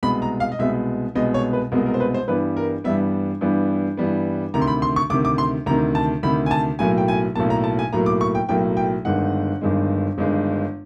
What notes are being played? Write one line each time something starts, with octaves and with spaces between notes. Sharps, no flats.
C2 B2 G#3 B3 B5
A#5
F5
D#5
C2 B2 G#3 B3 E5
C2 B2 G#3 B3 D#5
C#5
B4
C2 B2 G#3 B3 A#4
A#4
C5
B4
C5
G2 E3 G3 B3 B4
A#4
G2 E3 G3 B3 E5
G2 E3 G3 B3
G2 E3 G3 B3
D2 C3 D#3 A#5
C6
B5
C6
C#6
D2 C3 D#3 D6
D6
C6
D2 C3 D#3 A#5
A5
D2 C3 D#3 B5
G#5
A5
B1 A2 F#3 A#3 G#5
G5
G#5
B1 A2 F#3 A#3 A5
A#5
A5
G#5
B1 A2 F#3 A#3 A#5
D6
C#6
G5
B1 A2 F#3 A#3 G5
G5
G1 G2 D#3 G#3 F#5
G1 G2 D#3 G#3
G1 G2 D#3 G#3